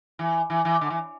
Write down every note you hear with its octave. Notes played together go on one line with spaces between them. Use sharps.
E3
E3
E3
D3
E3